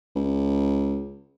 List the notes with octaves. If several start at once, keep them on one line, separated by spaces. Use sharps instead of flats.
C#2